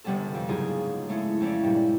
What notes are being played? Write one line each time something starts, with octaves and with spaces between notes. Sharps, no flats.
G1 C3 G3 B3 C#4 A4
F2
F#1 G#2 C#3 D#4 F4 G#4
G#3 A3 C#4 E4
F2 C#4 E4 D5
G2 A#2 G3